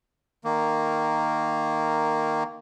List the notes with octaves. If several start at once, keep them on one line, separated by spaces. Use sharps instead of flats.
D#3 A#3